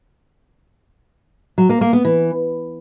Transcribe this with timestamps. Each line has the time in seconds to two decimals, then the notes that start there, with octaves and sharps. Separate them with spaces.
1.58 F#3
1.69 A#3
1.81 A#3
1.93 B3
2.05 E3